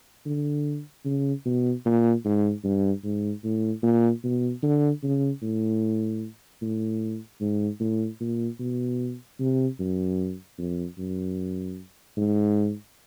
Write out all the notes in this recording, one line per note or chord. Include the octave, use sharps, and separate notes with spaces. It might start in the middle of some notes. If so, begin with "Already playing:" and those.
D3
C#3
B2
A#2
G#2
G2
G#2
A2
A#2
B2
D3
C#3
A2
A2
G#2
A2
A#2
B2
C3
F#2
F2
F#2
G#2